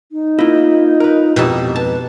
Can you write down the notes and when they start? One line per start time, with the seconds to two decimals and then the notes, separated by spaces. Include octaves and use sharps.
0.12 D#4
0.39 A#3 E4 F4
1.00 A#4 B4
1.36 F2 G#2 B2 D#4 E4 G4 A5
1.76 B4 A5